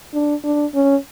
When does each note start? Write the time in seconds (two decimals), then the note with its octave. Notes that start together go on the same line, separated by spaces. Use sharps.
0.14 D4
0.44 D4
0.74 C#4